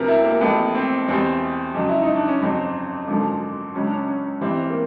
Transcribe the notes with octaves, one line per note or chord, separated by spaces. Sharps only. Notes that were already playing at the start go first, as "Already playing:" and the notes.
Already playing: D2 C3 F3 A#4 B4
E4
A#3
A1 A2 F3 B3
C4
E2 B2 G3 C4
F2 C#3 F#3
E4
D#4
D4
C#4
G1 F2 C#3 F#3 C4
G#1 F#2 D3 F3
C#2 C#3 F#3 C#4
D4
C#4
C#4
A1 G2 E3 G3 C4
A#3